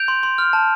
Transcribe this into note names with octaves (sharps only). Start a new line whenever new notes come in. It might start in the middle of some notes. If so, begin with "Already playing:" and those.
Already playing: G6 D7 F7
C6
C6
F6
A5